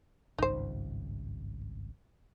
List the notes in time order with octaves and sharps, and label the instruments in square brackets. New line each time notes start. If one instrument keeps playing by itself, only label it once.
[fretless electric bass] G#1 C#2 G2 [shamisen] D#4 C5